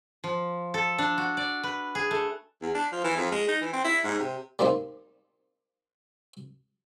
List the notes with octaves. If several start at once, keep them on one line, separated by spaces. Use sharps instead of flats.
F3
A4
D4
F#4
D5
B4
G#4
A3
E2
D4
F3
E3
F2
G#3
D#4
E3
C4
E4
G#2
C3
G3 A#3 C4 D#4